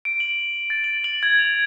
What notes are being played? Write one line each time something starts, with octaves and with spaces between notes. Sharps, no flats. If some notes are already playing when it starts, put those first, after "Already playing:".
D7
F#7
A6
F#7
F#7
G#6
F7